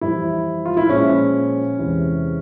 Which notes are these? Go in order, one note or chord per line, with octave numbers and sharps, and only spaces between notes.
F2 E3 G3 E4
F4
E4
A#2 F3 G#3 C#4
E2 C3 E3 G#3